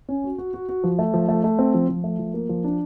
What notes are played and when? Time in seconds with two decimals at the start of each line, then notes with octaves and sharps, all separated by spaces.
0.09 C#4
0.24 F#4
0.38 F#4
0.54 F#4
0.69 F#4
0.84 F3
0.99 A3
1.14 F3
1.28 A3
1.44 A3
1.59 C4
1.74 F3
1.89 F3
2.04 A3
2.19 F3
2.34 A#3
2.49 F3
2.64 D4